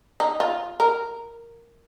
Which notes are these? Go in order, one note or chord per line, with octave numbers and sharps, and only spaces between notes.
D#4
F4
A#4